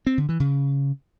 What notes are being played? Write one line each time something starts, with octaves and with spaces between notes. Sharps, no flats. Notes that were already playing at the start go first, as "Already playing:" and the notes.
C4
D3
E3
C#3